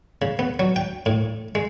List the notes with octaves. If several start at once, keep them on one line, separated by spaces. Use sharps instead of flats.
C#3
B3
F#3
G5
A2
G#3